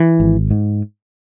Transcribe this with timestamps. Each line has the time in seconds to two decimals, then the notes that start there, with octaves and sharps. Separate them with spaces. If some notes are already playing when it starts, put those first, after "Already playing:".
Already playing: E3
0.20 G#1
0.51 G#2